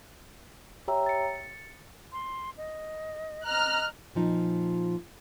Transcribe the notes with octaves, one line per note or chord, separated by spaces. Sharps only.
G4 C#5 E5 G5 A#5 E6
A6 C#7
C6
D#5
D#5 A#5 F6 F#6
A#2 F3 D#4